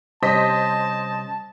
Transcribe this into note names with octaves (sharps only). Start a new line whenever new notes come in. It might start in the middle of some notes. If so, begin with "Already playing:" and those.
C3 G3 C#4 C5 D#5 A5 B6